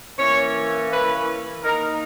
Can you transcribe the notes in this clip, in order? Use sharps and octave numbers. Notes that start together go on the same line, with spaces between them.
E3 A#3 C#4 C#5
B4
D#3 A#3 D#4 A#4